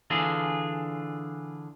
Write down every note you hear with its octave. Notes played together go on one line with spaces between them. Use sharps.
D3 E3 D4 F4 G#4